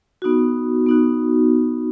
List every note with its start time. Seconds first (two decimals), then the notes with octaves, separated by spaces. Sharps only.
0.22 B3 D#4 F#4
0.86 B3 D#4 F#4